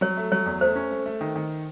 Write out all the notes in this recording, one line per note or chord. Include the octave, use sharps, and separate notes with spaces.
F#3 C#5
A3
F#3 C#5
E2
A3 C5
C#4
A3
A3
D#3
D#3